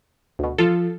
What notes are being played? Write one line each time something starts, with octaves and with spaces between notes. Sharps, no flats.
D2 B2
F3 F4 A4